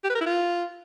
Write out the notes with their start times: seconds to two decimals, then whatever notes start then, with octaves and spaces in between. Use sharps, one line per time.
0.04 G4
0.10 B4
0.15 A#4
0.21 E4
0.26 F4